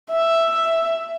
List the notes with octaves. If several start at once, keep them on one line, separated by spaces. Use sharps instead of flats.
E5